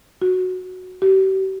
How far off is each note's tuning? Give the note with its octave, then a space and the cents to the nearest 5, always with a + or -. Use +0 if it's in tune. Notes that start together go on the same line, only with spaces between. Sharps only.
F#4 -5
G4 -40